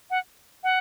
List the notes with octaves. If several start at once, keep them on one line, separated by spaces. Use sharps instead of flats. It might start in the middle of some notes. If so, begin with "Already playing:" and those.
F#5
F#5